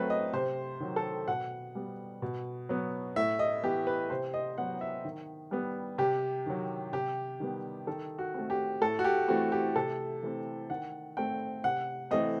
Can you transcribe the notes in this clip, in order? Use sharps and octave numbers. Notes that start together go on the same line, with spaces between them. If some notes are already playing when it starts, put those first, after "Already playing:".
Already playing: F#3 A3 C4 B4
D#5
C3 C5
D#3 F#3
A4
B2 F#5
G3 B3
B2
F#3 B3
A2 E5
D#5
E3 B3 G4
B4
C3 C5
D#5
F#3 B3 F#5
E5
D#3
G3 B3
C3 G4
D#3 F#3
C3 G4
D#3 G3 B3
D#3 A4
F#4
A3 C4
G4
A2 A4
F#4
G4
E3 A3 C4 F#4
G4
C3 A4
E3 A3 C4
D#3 F#5
A3 C4 G5
C3 F#5
E3 A3 C4 D#5